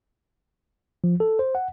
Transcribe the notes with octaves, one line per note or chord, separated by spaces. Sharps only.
F3
A4
C5
F#5